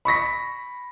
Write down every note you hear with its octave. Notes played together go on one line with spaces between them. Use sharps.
B5 C#6 A#6 B6